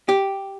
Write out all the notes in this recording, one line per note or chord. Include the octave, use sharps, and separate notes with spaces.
G4